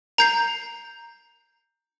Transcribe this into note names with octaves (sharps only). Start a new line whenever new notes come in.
A#5 G6 C7